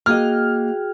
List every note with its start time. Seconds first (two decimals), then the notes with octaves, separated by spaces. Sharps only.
0.06 A#3 F#4 G#4 D#5 G5 F6